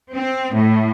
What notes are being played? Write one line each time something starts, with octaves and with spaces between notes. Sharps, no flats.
C4
A2